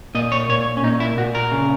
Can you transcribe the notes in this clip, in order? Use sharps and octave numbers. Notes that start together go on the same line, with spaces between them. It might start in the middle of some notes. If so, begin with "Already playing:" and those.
A#2 D#5
C#5
A#2 C#5
C#4
A#2 D#4
E4
A#2 F#4
A#4
C#3